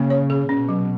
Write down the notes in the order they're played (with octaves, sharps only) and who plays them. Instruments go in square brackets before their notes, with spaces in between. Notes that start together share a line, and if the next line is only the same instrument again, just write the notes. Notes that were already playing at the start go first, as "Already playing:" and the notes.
Already playing: [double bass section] C#3 [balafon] A#3
[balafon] C#5
G#4
[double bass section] B2 [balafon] C#4
[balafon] F#3